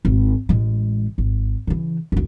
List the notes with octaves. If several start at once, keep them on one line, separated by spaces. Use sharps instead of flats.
G#1
A1 G#3
G#1
C#3 E3
F#1 D2